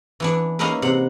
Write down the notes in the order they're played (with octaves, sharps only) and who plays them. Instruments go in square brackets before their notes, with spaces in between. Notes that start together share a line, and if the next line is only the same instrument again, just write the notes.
[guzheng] E3 B3 D4
A#3 C#4 D#4 E4 A#4 B4
C3 F#5